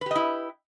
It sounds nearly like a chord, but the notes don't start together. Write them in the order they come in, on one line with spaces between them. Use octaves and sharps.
B4 G4 D#5 E4